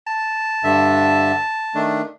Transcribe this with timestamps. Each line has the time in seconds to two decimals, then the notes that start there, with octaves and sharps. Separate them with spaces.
0.07 A5
0.64 G2 D3 E5
1.75 D#3 A3 D4